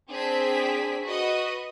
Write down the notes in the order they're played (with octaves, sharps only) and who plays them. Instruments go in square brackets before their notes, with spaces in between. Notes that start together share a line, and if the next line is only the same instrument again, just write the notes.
[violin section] C4 D4 G#4 B6
F#4 B4 D#5